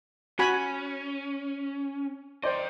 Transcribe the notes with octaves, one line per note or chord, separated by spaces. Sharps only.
C#4 F#4 G#5 B5
C5 D5 D#5 G5